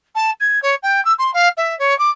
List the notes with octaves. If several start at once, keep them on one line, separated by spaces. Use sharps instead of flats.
A5
G#6
C#5
G5
E6
C6
F5
E5
C#5
D6